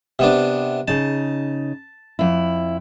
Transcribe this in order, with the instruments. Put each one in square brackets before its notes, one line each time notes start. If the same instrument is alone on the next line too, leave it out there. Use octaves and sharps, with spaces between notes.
[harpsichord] C3 B3 D4
[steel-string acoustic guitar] C#3 D#4 [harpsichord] A5
[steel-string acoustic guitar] F2 E4